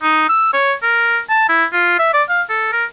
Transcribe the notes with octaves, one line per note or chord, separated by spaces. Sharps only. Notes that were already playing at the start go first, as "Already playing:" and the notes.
D#4
E6
C#5
A#4
A5
E4
F4
E5
D5
F5
A4
A#4